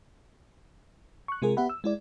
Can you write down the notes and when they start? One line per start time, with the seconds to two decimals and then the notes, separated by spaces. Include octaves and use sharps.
1.28 C#6 F#6
1.42 C3 G#3 F4 G#4 A#4
1.57 B3 G4 E5 F#5 B5
1.69 E6
1.84 G#3 E4 D5